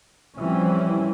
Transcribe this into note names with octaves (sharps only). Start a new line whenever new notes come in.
E3 F3 G3 C4 C#4